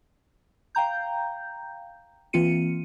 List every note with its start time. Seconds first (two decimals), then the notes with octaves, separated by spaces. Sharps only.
0.75 F5 G5 A#5 G6
2.33 E3 A#3 C4 F4 C#7 D#7